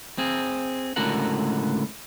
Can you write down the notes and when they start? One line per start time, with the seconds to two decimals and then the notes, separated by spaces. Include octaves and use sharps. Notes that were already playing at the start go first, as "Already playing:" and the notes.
0.18 C4 G#4
0.96 C#2 A2 D3 F#4 A#4 F#5